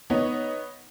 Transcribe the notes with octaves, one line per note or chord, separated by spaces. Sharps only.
B3 D#4 C#5